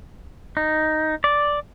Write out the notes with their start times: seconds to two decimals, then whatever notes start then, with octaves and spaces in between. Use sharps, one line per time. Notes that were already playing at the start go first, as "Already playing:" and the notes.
0.57 D#4
1.24 D5